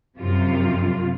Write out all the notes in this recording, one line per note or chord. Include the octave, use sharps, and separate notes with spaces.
F#2 C3 F4